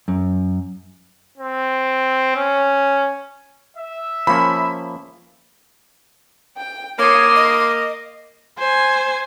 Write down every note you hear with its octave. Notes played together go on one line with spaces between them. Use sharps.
F#2
C4
C#4
E5
F3 A#3 C#4 B5
G5
A#3 C#5 C6 D6 D#6
D#5
C5 G#5